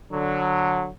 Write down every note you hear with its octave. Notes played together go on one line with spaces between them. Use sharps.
D3 F#3